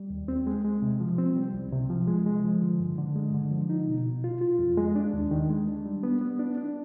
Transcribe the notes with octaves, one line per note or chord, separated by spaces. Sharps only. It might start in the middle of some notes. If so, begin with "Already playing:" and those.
Already playing: G3
D#2
C4
G#3
G#3
C3
F3
C4
G3
C2
C3
F3
G#3
G#3
F3
D3
G2
D3
G#3
D3
F3
D#4
B2
B2
F4
F4
F2
G#3
D4
D#2
D#3
G#3
D4
G3
B3
B3
D4
D4